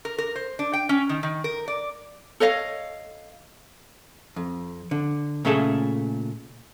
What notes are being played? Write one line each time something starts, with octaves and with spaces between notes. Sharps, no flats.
A#4
A#4
C5
D4
G5
C#4
D#3
D#3
A#4
D5
A4 C#5 D#5 F5
F2
D3
A#2 C#3 A3 G#4 A4 A5